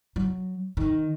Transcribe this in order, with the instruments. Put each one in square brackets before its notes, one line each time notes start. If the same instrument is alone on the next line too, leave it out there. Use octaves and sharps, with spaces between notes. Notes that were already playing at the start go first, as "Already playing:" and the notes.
[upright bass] F#3
D#3